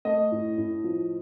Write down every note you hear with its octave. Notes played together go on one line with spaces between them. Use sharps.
A3 D#5
A2
A2
F3